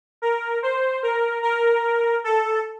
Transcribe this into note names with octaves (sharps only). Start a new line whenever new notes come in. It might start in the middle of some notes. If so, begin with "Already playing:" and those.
A#4
C5
A#4
A#4
A4